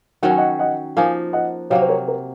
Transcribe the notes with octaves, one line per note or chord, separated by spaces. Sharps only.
D#3 F#3 C#4 F#5
G#5
D#5 F#5
D#5 F#5
F3 A#3 D#4 F5 G#5
D#5 F#5
C3 F#3 A#3 C#5 F5
C5
A#4 C#5
A#4